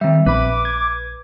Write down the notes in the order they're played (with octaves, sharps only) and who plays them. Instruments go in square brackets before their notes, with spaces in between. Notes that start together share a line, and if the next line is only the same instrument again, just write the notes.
[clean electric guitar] D#3 G3 [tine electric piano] C4 E5
[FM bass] A#1 [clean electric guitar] B4 B5 [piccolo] D6
[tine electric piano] G#6